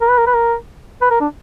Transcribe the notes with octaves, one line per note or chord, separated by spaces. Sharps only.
A#4
B4
A#4
B4
A#4
B4
A#4
D4